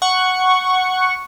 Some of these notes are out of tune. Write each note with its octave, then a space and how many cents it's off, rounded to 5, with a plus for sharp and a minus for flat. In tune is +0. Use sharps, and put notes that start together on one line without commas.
F#5 +0 C#6 +0